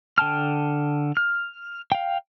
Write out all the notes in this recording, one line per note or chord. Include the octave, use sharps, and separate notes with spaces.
D3 G5 A5 F6
F6
F5 G5